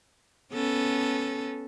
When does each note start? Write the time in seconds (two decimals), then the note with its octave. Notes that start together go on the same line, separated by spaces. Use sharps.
0.53 B3 C#4 A4